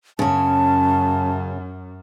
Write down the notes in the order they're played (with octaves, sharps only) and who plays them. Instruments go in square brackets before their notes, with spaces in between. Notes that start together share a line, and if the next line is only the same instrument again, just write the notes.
[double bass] F#2 [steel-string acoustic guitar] C#3 C#4 [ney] A5